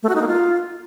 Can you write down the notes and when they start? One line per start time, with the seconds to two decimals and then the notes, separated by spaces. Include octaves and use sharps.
0.03 A3
0.09 F#4
0.15 D#4
0.21 A#3
0.28 F4